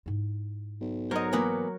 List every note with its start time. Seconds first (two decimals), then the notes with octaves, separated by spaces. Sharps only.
0.06 G#2 E4
0.80 B1
1.11 F#3 A#4 C5 C#5 D#5
1.33 E3 A#3 B3